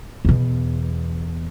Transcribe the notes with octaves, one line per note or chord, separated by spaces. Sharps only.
E2 B2